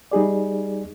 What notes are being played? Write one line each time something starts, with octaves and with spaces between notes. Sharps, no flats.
G3 D#4 G#4 D5